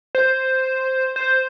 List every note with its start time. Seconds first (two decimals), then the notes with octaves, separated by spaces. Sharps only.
0.15 C5
1.16 C5